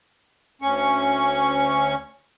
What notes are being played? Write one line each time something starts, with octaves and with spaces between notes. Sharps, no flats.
D2 C#4 C#6